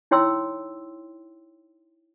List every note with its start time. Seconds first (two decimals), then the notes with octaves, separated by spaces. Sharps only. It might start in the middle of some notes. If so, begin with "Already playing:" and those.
0.11 D#4 E4 C#5 G5 C6 E6